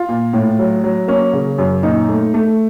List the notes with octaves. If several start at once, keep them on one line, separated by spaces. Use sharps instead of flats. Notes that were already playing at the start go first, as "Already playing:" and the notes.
Already playing: F4
A#2
A2
F#3
F#3
A#3 C#4
C#3
F#2
A#2 D#4
A3
A3